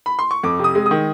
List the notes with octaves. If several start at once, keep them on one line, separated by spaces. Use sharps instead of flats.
B5
C6
C#6
F2 D6
C3 D#6
G#3
D#3 D#6